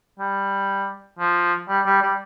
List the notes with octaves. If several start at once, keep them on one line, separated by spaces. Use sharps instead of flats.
G3
F3
G3
G3
G3